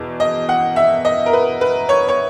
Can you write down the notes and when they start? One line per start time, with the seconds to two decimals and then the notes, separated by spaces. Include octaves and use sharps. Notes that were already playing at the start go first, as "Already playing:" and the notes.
Already playing: E2 B2
0.20 D#5
0.49 F#5
0.76 E5
1.05 D#5
1.26 A#4
1.33 B4
1.61 B4
1.89 C#5
2.09 C#5